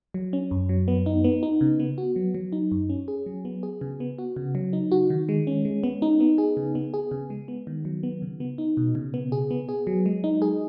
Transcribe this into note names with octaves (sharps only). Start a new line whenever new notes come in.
F#3
C#4
F#2
F#3
B3
D#4
B3
D#4
C#3
B3
F#4
F#3
F#3
D#4
F#2
C#4
G#4
F#3
B3
G#4
C#3
B3
F#4
C#3
F#3
D#4
F#4
D#3
G#3
C#4
G#3
B3
D#4
B3
G#4
C#3
B3
G#4
C#3
G#3
B3
D#3
F#3
B3
C#3
B3
D#4
B2
C#3
B3
G#4
B3
G#4
F#3
G#3
D#4
G#4